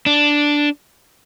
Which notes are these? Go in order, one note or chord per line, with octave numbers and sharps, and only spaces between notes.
D4